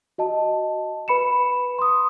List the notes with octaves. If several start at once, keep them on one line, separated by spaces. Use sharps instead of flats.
F#4 D#5 A5
B4 B5 C#7 E7
C6 D#6